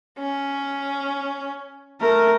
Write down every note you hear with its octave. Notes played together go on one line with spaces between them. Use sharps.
C#4
A3 A#4